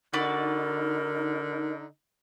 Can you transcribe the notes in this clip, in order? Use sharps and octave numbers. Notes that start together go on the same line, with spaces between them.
D3 D#4 F#4 A#4 B4 D5